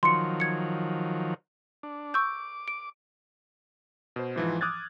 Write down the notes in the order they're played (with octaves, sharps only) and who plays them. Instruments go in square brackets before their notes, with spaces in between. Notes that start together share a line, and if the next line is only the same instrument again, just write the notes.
[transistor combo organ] D#3 F3 F#3 [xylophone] C6 C#7
[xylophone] G#6 C#7
[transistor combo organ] D4
[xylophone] C#6 E6 G6 [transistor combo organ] D6
[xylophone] D7
[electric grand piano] B2 C5
G#2 E3 F3
D6 D#6 F6 F#6 G#6 A6